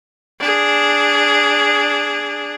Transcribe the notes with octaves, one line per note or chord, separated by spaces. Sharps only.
D4 G#4